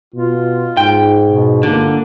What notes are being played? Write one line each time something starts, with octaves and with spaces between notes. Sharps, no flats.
B2 F4
G#2 G5
B2
G1 D3 A#3